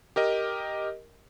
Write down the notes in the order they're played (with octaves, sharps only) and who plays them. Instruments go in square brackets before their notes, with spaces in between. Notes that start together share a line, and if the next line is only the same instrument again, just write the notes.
[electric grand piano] G4 A#4 D#5